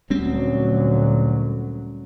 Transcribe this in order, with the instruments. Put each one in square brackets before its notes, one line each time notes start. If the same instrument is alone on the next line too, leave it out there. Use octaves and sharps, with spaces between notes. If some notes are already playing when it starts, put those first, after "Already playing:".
[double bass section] D2 A#2 F#3 [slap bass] G3 C4 C#4